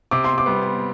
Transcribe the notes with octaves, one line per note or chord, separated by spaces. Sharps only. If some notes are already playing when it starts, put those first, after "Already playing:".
C3 D6
C6
D6
G3 B3